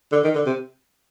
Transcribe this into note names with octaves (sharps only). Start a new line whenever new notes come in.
D3
D#3
D3
C3